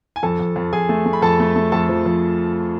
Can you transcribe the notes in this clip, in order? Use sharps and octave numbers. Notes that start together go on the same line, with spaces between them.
G#5
F2 A4 A5
F2
F2
F2 G#4 G#5
A3
A3
B5
F2 A4 A5
A3
A3
F2 A4 A5
F3
F3